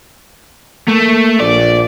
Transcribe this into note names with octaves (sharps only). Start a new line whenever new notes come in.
A3 A#3
A#1 D5